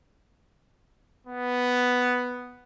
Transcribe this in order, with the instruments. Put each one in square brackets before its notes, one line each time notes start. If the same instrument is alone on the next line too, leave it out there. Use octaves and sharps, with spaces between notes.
[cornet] B3